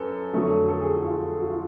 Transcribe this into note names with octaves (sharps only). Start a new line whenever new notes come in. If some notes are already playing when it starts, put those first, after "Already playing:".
Already playing: F#2 A4 B4
F2 D3 F#3 A3
A4
G#4
F#4
F4
F#4
F4